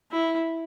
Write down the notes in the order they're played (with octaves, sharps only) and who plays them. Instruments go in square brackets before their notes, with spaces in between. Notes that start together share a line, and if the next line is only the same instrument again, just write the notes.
[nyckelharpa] E4